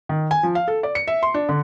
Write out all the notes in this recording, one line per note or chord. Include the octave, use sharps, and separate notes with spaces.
D#3
G#5
F3
F5
A4
D5
C#7
E5
C6
D4
D3